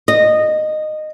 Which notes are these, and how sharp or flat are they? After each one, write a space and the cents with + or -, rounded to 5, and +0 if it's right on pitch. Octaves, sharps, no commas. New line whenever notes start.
D#5 -15